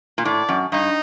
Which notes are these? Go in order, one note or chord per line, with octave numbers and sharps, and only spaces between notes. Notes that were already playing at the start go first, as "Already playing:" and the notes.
A#2
A2 D5
F#2
G2 D#4